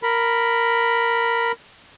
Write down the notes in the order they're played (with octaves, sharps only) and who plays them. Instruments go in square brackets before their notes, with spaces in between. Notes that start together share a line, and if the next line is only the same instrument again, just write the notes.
[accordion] A#4 B5